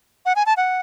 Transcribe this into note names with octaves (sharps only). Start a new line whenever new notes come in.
F#5
G#5
A5
F#5